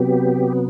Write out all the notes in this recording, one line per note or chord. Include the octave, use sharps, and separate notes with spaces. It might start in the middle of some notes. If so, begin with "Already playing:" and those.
Already playing: C3 F#3 B3 G4